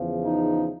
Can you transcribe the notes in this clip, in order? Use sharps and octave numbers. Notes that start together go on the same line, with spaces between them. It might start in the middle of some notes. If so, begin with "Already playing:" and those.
Already playing: E2 C#3 F3
D#4